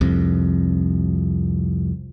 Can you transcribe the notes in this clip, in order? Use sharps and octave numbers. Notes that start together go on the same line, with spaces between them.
C2 F2